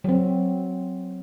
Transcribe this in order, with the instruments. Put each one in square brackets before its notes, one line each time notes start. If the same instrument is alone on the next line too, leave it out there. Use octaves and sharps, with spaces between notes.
[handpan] F#3 C4